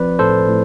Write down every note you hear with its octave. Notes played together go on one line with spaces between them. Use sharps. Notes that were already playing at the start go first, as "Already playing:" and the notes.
Already playing: F3 C4 B4 D5
A2 A4 C5
A2